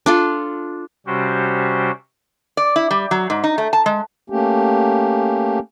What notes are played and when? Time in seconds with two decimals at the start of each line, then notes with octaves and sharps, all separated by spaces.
0.06 D4 F4 A4
1.07 C3 G3 C#4 F#4 G4 C5
2.57 D5
2.76 E4
2.91 G3
3.11 F#3
3.30 G#2
3.44 D#4
3.58 A3
3.73 A5
3.86 G#3
4.30 A3 A#3 C#4 G4